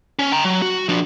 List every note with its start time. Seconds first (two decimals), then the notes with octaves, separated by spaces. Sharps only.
0.19 C#4
0.32 G5 A#5
0.44 F#3
0.62 F#4
0.89 F3 D4